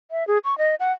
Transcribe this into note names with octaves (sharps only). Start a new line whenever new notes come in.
E5
G#4
C#6
D#5
F#5